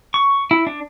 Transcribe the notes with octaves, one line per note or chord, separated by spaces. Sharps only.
C#6
E4
D4